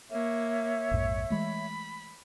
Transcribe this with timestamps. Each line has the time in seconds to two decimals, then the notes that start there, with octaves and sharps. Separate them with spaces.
0.10 A#3 C#5 E5
0.91 A#1 F2 G#2
1.30 E3 G#3 A3 B5